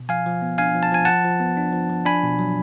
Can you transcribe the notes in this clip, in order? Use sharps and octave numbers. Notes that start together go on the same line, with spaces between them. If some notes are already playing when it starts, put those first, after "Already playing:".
Already playing: B2
F3 F5 G#5
F3
B3
D4 F5 G#5
F3
A5
F3 G#5
F3 F#5 A5
F3
B3
D4
F3
F3
D4 G#5 B5
B2
F#3